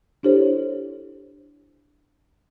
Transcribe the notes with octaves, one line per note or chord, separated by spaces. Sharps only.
D4 E4 G4 A4 C5 C#5